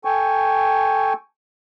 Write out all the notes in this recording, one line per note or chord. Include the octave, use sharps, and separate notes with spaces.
A4 G5 G#5 C#6